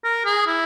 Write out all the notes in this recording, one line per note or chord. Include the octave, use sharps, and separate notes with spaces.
A#4
G#4
E4